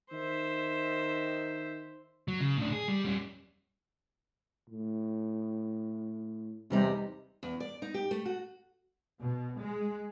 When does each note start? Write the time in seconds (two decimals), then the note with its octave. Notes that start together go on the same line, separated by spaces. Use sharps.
0.12 D#3 C5 E5
2.28 F#3
2.41 C#3
2.57 A2 D4
2.73 G#4
2.88 G3
3.05 G3 C#4
4.70 A2
6.70 E2 C3 G3 D#4
7.43 E2
7.60 D5
7.82 D#4
7.94 G4
8.11 A3
8.25 F#4
9.21 B2
9.58 G#3